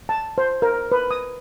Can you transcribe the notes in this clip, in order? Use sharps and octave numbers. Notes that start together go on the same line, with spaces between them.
A5
C5
A#4
B4
D#6